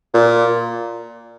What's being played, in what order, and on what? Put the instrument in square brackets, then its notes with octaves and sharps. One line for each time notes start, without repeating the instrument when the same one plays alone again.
[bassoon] A#2